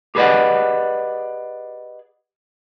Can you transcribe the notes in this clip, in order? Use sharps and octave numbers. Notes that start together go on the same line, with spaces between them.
G4 G#4 B4 D5 D#5 F#5